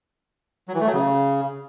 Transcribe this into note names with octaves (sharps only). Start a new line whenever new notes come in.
F#3
E3
A3
F#3
C#3